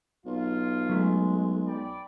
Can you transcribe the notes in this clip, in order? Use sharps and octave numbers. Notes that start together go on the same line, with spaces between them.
B1 F4
F#3 G#3 A3
D5 G5 B5